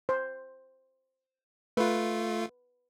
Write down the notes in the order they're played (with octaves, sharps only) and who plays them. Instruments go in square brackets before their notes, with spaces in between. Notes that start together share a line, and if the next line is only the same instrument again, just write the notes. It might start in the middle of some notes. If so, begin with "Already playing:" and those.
[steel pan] C5
[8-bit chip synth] A3 F4 [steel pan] B4